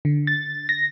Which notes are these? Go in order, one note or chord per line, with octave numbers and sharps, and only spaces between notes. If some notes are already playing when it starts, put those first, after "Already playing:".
D3
A6
A#6